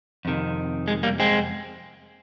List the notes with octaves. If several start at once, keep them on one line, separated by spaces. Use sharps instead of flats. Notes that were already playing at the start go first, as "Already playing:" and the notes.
F2 C3 D#3
G#3
G3 A#3
G#3 C4